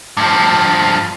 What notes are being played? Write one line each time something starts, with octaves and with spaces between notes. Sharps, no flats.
G2 F3